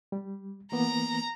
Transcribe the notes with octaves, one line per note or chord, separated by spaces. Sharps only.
G3
E3 A#3 B3 A#5